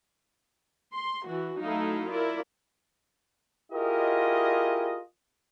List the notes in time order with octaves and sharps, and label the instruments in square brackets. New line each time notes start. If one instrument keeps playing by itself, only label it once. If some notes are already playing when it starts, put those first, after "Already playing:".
[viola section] C6
E3 F#4
F#3 A3 D#4 E4 F5
E4 F4 A#4 D5
[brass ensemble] E4 F4 G4 G#4 A#4 D#5